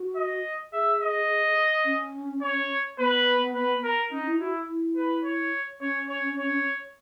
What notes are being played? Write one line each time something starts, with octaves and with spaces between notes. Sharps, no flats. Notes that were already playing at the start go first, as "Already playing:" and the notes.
Already playing: F#4
D#5
G#4 E5
D#5
C#4
C#5
B3 B4
B4
A#4
C#4 D#4
E4
E4 F#4
E4
B4
C#5
C#4 C#5
C#5
C#5